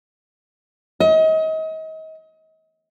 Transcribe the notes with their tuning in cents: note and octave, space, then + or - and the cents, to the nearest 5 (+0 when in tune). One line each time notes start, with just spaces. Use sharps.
D#5 +35